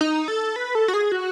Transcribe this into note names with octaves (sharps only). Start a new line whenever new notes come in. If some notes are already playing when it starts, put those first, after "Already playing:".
D#4
A4
B4
A4
F#4
G#4
F#4